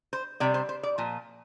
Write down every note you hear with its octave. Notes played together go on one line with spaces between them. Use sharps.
C5
C3 G3 D5
C5
C5
D5
A#2 F3